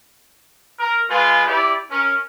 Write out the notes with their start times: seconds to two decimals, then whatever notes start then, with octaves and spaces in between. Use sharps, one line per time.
0.79 A#4
1.09 G#3 F4 B4 G#5
1.47 E4 G4 D5
1.91 C#4 A#4